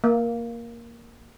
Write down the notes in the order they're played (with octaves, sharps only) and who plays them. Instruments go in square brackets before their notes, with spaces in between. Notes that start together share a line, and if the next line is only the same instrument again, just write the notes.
[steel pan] A#3